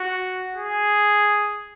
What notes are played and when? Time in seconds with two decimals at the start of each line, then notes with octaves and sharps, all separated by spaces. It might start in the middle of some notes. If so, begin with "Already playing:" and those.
Already playing: F#4
0.56 G#4